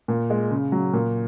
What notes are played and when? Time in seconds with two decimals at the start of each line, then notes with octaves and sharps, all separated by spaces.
0.08 A#2
0.30 G#3
0.51 C#3
0.72 F#3
0.93 A#2